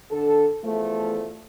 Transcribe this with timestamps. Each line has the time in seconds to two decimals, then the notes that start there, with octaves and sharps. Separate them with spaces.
0.11 D3 A4
0.64 E2 F3 A3